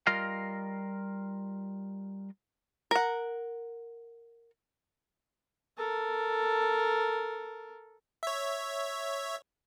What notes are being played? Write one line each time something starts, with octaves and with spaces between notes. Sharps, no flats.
G3 F4 A#4 D#5 F5
A#4 F#5
A4 A#4
C#5 E5